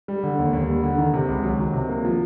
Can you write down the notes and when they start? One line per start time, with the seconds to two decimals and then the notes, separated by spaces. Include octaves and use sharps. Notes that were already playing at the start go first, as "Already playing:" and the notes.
0.08 G3
0.23 D3
0.39 D#2
0.53 D#2
0.69 G3
0.84 D3
0.98 D#3
1.14 C3
1.29 C#2
1.44 F#3
1.59 D#3
1.73 C3
1.89 A#3
2.05 F3